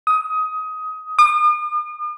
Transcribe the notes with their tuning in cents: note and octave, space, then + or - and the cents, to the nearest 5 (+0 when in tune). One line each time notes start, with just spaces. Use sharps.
D#6 +20
D#6 -45